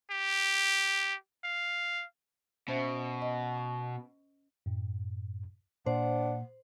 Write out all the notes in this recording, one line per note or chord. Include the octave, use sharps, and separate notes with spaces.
G4
F5
B2 C#4 C5 E5
D#5
C#6
F#2 A2
A#2 D4 C5 F#5